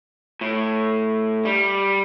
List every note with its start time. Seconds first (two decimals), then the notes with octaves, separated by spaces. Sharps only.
0.41 A2
1.45 G3